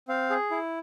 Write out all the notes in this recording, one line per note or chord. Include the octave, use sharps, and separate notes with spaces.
C4 F5
G#4
E4